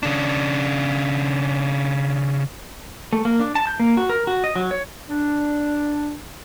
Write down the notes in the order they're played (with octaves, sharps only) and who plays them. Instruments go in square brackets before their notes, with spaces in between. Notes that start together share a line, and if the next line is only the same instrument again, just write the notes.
[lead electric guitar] C#3 D4
[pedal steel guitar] A3
A#3
D4
A5
G6
A#3
F#4
A#4
F#4
D#5
F#3
C#5
[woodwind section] D4